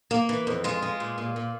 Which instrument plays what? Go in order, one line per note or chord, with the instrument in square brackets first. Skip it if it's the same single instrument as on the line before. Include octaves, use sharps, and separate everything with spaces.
[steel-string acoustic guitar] A#3
E3
F2
G#3 F4
G#3
A#2
A#2
A#2